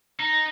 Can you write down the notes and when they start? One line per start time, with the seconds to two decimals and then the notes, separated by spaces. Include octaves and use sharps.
0.20 D#4